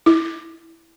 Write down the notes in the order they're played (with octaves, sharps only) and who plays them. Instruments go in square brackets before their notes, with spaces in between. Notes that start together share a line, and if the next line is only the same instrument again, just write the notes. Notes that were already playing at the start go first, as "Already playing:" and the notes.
[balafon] E4